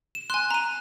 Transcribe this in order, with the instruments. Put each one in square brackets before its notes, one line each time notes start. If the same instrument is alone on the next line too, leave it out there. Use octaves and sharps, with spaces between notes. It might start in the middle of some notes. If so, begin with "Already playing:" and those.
[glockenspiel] E7
[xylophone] G#5 C6 [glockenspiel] F#6
[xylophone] A#5 D#7